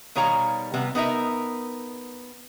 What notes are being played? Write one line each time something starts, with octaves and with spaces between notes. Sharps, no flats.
B2 D#3 G3 C#5 F5 A#5
C3 G3 B3
B3 D#4 A#4 E5